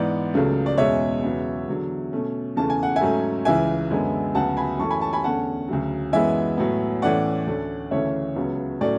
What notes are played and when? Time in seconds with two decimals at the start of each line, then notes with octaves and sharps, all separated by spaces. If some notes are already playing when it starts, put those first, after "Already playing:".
Already playing: G#2 E3 B3 D5
0.34 C#2 C#3 F#3 A3
0.66 D5
0.78 E2 B2 G#3 C#4 C#5 E5
1.23 E2 C#3 F#3 B3
1.67 E2 D3 F#3
2.12 B2 A3 C#4
2.56 E2 C#3 E3 A3 C#4 A5
2.70 G#5
2.83 F#5
2.96 E5 G#5
3.01 G#2 F#3 A3 C#4
3.45 C#2 C#3 E3 E5 G#5
3.91 F#2 D3 G#3 B3
4.35 D2 C#3 F#3 B3 F#5 A5
4.57 G#5 B5
4.79 F#2 E3 A3 C#4 A5 C#6
4.90 G#5 B5
5.01 A5 C#6
5.13 G#5 B5
5.24 E2 D3 A3 C#4 F#5 A5
5.68 D2 C#3 F#3
6.13 F#2 E3 G#3 B3 E5 G#5
6.57 A2 F#3 B3
7.02 A2 E3 A3 C#4 D5 F#5
7.47 D2 D3 A3 C#4
7.91 D2 C#3 E3 A3 C#4 C#5 E5
8.36 C#2 C#3 F#3 B3
8.81 A2 F#3 A3 C#4 D5